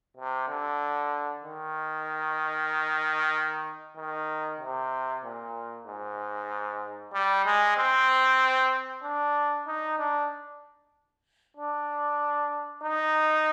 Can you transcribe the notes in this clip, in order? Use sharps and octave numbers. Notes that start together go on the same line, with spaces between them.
C3
D3
D#3
D#3
C3
A#2
G#2
G3
G#3
C4
D4
D#4
D4
D4
D#4